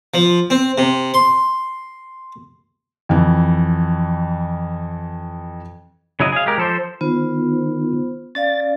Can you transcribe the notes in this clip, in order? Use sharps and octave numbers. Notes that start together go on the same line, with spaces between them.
F3
C4
C3
C6
F2 E3
C#3 F#3 E4 D#5
G#4 F5
G#3 G4 A#4
F3 A4 C5
D#3 B3 F4 C5
C#4 D5 F5 A6